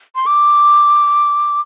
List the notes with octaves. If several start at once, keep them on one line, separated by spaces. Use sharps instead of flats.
C6
D6